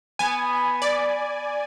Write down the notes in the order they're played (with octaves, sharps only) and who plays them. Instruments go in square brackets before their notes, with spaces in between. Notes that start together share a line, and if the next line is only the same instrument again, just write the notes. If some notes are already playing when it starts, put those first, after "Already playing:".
[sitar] B3 [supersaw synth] G#5
[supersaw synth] D5